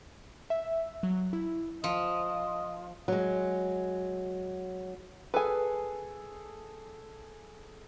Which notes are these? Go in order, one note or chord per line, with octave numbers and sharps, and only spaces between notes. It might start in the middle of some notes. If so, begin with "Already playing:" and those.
E5
F#3
E4
F3 D#5
F#3 G#3
G#4 A4 B4 G#5